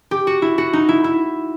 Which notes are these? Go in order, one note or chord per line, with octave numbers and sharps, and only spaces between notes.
G4
F#4
E4
F#4
D#4
E4
E4